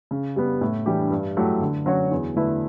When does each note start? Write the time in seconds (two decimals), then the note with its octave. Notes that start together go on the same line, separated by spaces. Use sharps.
0.11 C#3
0.36 G3 B3
0.61 A2
0.86 E3 G3 D4 G4
1.11 G2
1.37 F#3 A3 E4 G4
1.62 D3
1.86 F#3 C#4 F#4 C#5
2.11 E2
2.36 D3 A3 E4 B4